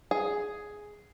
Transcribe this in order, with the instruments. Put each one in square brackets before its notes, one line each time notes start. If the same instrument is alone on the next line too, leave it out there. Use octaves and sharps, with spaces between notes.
[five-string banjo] G#4